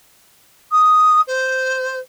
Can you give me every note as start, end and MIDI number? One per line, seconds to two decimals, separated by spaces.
0.72 1.21 87
1.27 1.99 72